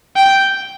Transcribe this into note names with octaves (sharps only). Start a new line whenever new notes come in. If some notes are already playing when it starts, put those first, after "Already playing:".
G5